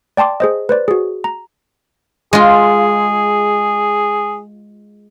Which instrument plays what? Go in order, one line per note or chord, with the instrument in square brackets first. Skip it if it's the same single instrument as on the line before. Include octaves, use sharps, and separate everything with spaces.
[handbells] D5 G5 A5 C6 D6
G#4 C5 D#5
B4 C5 D5
F#4 G#4
A#5
[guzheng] G#3 F4 [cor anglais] G#4